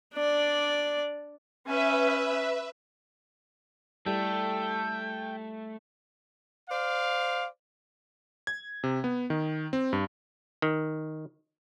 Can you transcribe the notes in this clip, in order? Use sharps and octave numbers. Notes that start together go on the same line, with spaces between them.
D4 D5
C#4 B4 E5 G#5
G3 A3 E4 A4 G5
C5 D5 F5
G#6
C3
B3
D#3
C4
G2
D#3